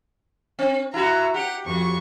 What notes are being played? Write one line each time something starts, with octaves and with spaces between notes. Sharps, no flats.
C4
E4 F#4 A#5
G4 F#5 G5
F2 F#4 C#6